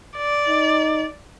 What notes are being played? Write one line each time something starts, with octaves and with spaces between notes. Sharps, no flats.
D5
D#4